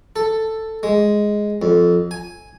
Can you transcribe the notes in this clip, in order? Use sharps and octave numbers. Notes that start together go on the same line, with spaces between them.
A4
G#3
F2
G#5